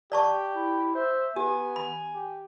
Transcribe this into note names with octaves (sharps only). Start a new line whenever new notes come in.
G4 D5 A5 C#6
E4
C5 E5
B3 G4 G#5
B5
G4